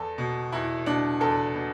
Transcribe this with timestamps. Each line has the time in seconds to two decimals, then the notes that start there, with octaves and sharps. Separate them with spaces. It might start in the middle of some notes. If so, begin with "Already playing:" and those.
Already playing: E2 A4
0.18 B2
0.52 E2 E4
0.86 B2 D4
1.20 E2 A4
1.55 B2